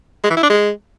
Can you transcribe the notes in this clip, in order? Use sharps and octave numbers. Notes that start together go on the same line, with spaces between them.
G#3
E3
E4
D4
G#3